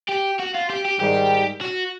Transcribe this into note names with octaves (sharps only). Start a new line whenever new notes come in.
G4
F#4
F4
G4
G4
G#2 D#3 G3 G4
F#4